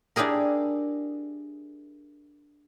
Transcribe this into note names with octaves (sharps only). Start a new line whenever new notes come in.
D4 E4 G4 G#4 A#4